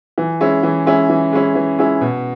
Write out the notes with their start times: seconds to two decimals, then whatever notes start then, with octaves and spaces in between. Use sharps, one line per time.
0.18 E3
0.41 G#3 C#4 E4
0.63 E3
0.86 G#3 C#4 E4
1.09 E3
1.32 G#3 C#4 E4
1.55 E3
1.78 G#3 C#4 E4
2.01 B2